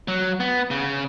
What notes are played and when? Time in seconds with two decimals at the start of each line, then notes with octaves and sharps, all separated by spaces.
0.08 F#3
0.40 B3
0.71 C#3